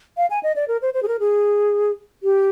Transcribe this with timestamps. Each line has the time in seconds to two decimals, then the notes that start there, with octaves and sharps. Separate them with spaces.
0.17 F5
0.30 G#5
0.43 D#5
0.56 D5
0.68 A#4
0.82 C5
0.94 C5
1.03 G#4
1.08 A#4
1.20 G#4
2.23 G4